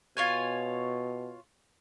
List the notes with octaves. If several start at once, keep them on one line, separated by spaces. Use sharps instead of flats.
B2 F4 C#5 G#5